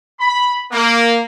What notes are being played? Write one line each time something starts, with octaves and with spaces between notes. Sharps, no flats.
B5
A#3